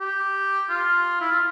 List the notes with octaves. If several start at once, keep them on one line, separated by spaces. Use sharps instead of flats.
G4
F4
E4
F4